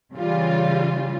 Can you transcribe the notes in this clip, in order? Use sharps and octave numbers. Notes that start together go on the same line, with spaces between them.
C#3 E3 G3 F4